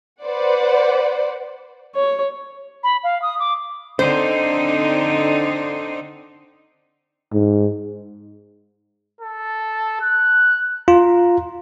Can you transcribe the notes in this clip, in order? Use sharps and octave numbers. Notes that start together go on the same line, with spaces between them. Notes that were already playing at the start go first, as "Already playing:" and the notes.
B4 C5 D5 F#5
C#5
B5
F5
D#6
D6
D3 C4 D#4 C5
G#2
A4
F#6
F4 A#5